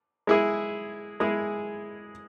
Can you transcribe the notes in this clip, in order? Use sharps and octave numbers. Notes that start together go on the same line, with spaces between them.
G#3 E4 G#4
G#3 E4 G#4